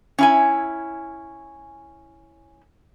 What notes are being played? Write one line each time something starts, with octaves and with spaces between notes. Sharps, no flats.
C#4 E4 G#5